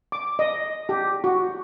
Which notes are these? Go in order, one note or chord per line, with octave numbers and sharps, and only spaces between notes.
D6
D#5
G4
F#4